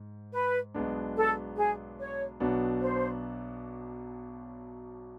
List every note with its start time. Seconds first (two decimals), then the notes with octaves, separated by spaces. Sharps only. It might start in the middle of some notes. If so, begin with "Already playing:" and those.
Already playing: G#2
0.33 B4
0.74 B1 B2 G#3 B3 D4
1.17 A4
1.58 G#4
1.99 C#5
2.40 B1 B2 F#3 B3 D4
2.83 C5